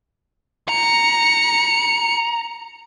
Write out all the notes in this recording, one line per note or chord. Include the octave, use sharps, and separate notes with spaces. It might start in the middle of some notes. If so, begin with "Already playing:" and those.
A#5 C#7